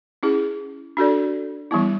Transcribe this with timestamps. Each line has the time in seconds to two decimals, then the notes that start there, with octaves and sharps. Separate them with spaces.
0.23 C#4 E4 G#4
0.97 D4 F#4 A4 D5
1.71 E3 G3 B3 E4